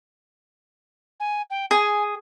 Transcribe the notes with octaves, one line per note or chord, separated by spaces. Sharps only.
G#5
G5
G#4 G#5